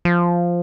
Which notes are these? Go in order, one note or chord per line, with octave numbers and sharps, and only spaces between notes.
F3